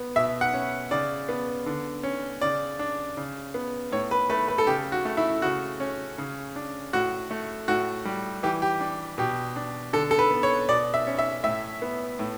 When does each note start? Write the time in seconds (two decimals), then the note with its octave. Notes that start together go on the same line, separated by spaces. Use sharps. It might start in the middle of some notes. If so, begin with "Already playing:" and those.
Already playing: B3
0.16 B2 E5
0.41 F#5
0.54 C#4
0.91 C#3 D5
1.29 B3
1.66 D3
2.03 C#4
2.41 C#3 D5
2.79 D4
3.17 C#3
3.54 B3
3.92 A2 C#5
4.11 B4
4.30 A3 B4
4.48 B4
4.58 A4
4.67 C#3 G4
4.92 F#4
5.05 A3
5.17 E4
5.42 C#3 F#4
5.80 C#4
6.18 C#3
6.56 D4
6.93 A2 F#4
7.31 A3
7.68 A2 F#4
8.05 G3
8.43 E3 G4
8.62 G4
8.80 D4
9.18 B2 G4
9.56 D4
9.93 D3 A4
10.11 A4
10.19 B4
10.31 B3
10.43 C#5
10.68 B2 D5
10.94 E5
11.07 C#4
11.19 E5
11.44 A2 E5
11.82 B3
12.19 A2